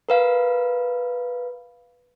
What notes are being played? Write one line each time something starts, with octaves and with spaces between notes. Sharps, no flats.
A#4 B4 F5